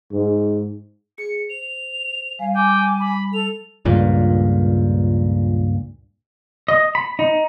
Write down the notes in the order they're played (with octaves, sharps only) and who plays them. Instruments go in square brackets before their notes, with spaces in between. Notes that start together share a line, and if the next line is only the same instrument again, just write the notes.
[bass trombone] G#2
[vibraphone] G#4 [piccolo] C#7
[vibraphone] C5 [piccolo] F7
[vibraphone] G3 [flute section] F5 G#5
[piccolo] G5 [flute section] G#5 D6
[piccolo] B5
[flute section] A4 [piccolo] F7
[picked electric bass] C#2 G2 A#2
[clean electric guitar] D#5
B5
D#4